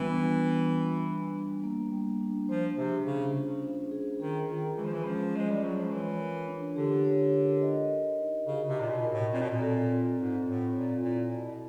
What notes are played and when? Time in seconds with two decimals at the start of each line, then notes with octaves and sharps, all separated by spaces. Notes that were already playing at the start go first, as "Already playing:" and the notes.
Already playing: E3 G3 B3 D4 F4
0.21 F4
0.50 D4
0.78 G3
1.06 D4
1.35 G3
1.64 A#3
1.92 G3
2.21 D4
2.49 F3 C5
2.77 C3 G#4
3.06 C#3 C#4
3.34 F4
3.62 C5
3.91 G#4
4.20 D#3 G#4
4.48 D#3 F4
4.77 E3 G#3
4.85 F3
4.93 E3
5.05 F3 C#4
5.34 G#3 G#4
5.51 G3
5.63 F#3 F4
5.77 F3
5.91 E3 C#5
6.19 A#4
6.48 D4
6.76 D3 G4
7.04 C#5
7.33 A#4
7.61 D#5
7.90 A#4
8.19 D#4
8.47 C#3 F#4
8.68 C3
8.76 A#2 D#5
8.90 B2
9.04 A#4
9.11 A2
9.33 A#2 C4
9.41 B2
9.51 A#2
9.61 A4
9.90 C4
10.18 G#2 F4
10.46 A2 C4
10.75 A#2 A4
11.03 A#2 E4
11.32 B2 D5